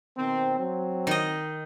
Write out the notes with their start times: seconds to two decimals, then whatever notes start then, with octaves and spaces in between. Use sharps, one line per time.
0.18 B2 D#3 C4
0.59 F#3 C4
1.07 D#3 D#5